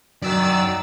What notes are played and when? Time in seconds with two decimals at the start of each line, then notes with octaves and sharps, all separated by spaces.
0.22 F#2 D#3 D5 E6 A6